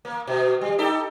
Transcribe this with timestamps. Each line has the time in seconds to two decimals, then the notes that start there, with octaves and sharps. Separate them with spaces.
0.05 A#3
0.27 B2
0.61 G3
0.78 D#4 G4 A4